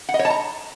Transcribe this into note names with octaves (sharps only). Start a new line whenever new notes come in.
F#5
D#5
C#5
A5
A#5